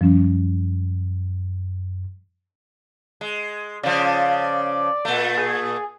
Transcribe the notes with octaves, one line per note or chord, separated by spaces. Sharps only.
F#2 F3 G3 C#4
G#3
C#3 F3 D5
A#2 A3
G#4